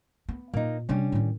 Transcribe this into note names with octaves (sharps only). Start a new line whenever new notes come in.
B3
A#2 A#3 D#4
C3 G3 C#4 D4
A2 D#3